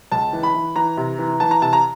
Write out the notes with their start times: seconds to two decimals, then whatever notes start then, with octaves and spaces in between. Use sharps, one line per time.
0.11 C#2 A5
0.33 E3
0.43 B5
0.54 E3
0.76 E3 A#5
0.97 C3
1.19 E3
1.40 E3 A5
1.51 A#5
1.62 C3 A5
1.73 A#5